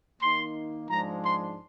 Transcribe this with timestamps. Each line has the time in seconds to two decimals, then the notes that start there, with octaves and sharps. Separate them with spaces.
0.20 D#3 A#3 D#4 C6
0.89 G#2 F3 G#3 D4 A#5
1.24 C6